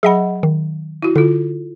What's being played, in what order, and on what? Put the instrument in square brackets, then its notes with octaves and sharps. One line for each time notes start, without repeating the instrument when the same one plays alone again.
[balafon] F#3 B5 [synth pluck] G#4 D#5 F#5
[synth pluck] D#3
[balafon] E4 F#4
[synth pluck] D3 [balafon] F4 A4